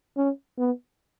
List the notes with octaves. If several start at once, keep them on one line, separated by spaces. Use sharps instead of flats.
C#4
B3